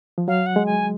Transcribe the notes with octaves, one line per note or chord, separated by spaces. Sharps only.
F3
F#3 F5
F#5
G#3
G#5